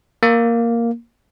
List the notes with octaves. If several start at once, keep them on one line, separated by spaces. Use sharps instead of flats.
A#3